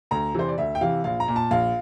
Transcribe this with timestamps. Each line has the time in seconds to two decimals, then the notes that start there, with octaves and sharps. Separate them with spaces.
0.11 D2 A#5
0.34 C3 E3 C5
0.48 D5
0.58 D2 E5
0.75 G5
0.81 C3 E3 F5
1.04 A#1 F5
1.20 A#5
1.28 A#2
1.36 A5
1.51 A#1 F5